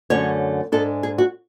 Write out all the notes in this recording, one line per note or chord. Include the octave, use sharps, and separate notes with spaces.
F#2 D3 A3 C#4 C#5
G#2 G#3 D4 A4
G#4
F#4